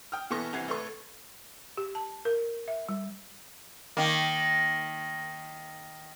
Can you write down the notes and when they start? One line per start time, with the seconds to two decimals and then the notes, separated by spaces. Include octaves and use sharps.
0.12 G5 D#6 F6
0.30 B2 E3 B3 A4 C#6 A#6
0.53 G1 C3 E3 F#5 G#6 C7
0.68 G#1 A3 A4 B4 C#6
1.77 G4
1.95 A5
2.25 A#4
2.68 E5
2.89 G3
3.97 D#3 A#3